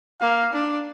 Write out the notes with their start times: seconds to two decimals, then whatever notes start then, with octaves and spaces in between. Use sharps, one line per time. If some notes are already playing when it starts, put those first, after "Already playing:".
0.21 A#3 F5
0.53 D4